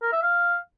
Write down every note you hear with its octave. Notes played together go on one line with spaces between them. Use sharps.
A#4
E5
F5